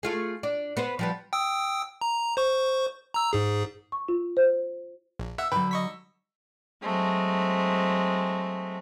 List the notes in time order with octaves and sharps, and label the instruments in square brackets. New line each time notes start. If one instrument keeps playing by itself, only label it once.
[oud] A3 F4 G#4
D4
B3 B4 C5
F3 G3 B3
[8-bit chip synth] G5 D#6 E6
A#5
C5 C#6
A#5 E6
G#2 G#4
[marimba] C#6
F4
C5
[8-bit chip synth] A#1
[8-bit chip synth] E5 F#5 [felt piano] E6
[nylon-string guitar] D3 F#3 [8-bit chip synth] B4 G5 [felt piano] B5
[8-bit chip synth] D#5 C#6 B6
[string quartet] F#3 G#3 A3 C4